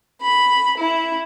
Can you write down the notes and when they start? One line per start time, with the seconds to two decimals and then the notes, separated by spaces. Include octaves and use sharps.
0.22 B5
0.78 E4